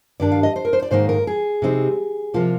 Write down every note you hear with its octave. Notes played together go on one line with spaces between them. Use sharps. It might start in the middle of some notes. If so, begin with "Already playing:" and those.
G2 D#3 G3 D4 D5
F5
D#5
C5
A#4
C5
D5
G#2 D#3 A#3 D#4 C5
A#4
G#4
C3 G3 C4 D#4
C3 F3 A#3 F4